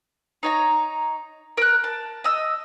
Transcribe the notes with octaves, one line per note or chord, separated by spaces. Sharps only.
D#4 C#5 A#5
A#4 F#6
A5
D#5 E6